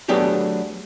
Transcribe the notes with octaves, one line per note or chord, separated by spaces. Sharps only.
F#3 A3 B3 D4 G4 G#4